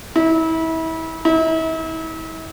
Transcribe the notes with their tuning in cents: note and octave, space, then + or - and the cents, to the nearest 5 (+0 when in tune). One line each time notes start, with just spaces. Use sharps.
E4 -30
E4 -40